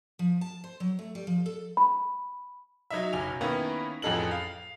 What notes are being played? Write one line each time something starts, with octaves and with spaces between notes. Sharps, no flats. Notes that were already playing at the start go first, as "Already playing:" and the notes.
F3
A5
C5
F#3
A3
G3
F3
A4
B5
F#3 D#4 E5
F#1 B1 G#5 F7
D#3 A#3 B3 C#4 E4
A1 F2 G#4 A4 D#5 F#7
F5